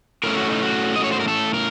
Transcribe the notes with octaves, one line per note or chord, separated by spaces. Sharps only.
A2 A3 C#4 A#4
F#4
D#4
F#4
D#5
C#5
C5
A#4
A4
A#4